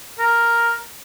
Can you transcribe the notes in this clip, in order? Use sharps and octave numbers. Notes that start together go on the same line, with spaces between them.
A#4